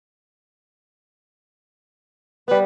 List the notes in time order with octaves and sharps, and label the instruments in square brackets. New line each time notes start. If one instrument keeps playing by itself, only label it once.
[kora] G3 B3 [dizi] B4